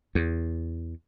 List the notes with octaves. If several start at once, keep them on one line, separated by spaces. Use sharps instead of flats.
E2